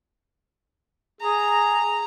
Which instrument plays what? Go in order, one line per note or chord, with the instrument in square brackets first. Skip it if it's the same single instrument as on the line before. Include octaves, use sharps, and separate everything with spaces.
[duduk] G#4 [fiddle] A#5